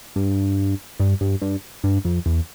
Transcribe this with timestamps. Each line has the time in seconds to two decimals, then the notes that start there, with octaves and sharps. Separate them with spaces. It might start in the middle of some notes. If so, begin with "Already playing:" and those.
0.16 G2
1.00 G2
1.21 G2
1.42 G2
1.84 G2
2.05 F2
2.26 E2